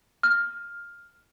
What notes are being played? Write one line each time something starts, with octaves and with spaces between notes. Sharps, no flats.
F6